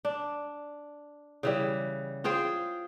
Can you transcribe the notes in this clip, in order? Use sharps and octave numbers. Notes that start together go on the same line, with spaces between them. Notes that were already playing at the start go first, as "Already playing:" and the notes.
D4
C#3 E3 G3
F4 G#4 C5 G5